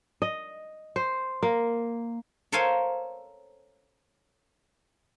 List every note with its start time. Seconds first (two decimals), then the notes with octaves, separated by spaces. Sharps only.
0.22 D#5
0.96 C5
1.43 A#3
2.52 A4 A#4 C5 C#5 F5 G#5